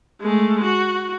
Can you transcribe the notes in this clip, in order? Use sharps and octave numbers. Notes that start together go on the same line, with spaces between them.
G#3 A3
F#4